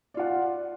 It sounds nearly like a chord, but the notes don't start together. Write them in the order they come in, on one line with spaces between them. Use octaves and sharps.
D5 F4 F#5